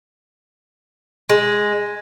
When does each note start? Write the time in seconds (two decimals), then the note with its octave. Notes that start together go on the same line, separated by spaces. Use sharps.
1.29 G#3